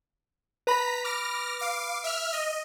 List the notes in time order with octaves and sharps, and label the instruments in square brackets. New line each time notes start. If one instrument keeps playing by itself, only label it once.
[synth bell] B4 B5 [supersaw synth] A#5 B6
[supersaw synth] D6 F6 A#6
F5 D6
E5 F6
D#5